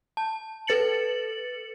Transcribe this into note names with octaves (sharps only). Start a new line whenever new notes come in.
A5
A4 B4 A6 C#7 F#7